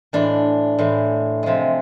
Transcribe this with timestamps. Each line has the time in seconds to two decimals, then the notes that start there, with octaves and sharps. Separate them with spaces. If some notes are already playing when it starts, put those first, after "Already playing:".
0.13 A2 E3 G#3 D4
0.79 A2 E3 G#3
1.43 C3 F3 G#3